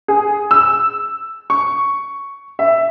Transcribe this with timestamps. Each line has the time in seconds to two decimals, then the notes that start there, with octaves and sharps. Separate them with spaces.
0.08 G#4
0.51 E6
1.50 C#6
2.59 E5